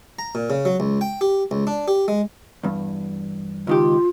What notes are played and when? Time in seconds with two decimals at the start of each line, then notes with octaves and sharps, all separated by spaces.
0.19 A#5
0.35 A#2
0.50 C#3
0.65 F#3
0.80 C#2
1.01 G5
1.21 G4
1.51 C#2
1.67 D4
1.88 G4
2.08 G#3
2.63 E2 G2
3.67 C#2 D#3 F4 G4